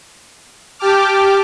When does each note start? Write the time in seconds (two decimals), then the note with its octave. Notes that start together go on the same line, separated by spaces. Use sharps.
0.79 G4 G5 A5 D6 F6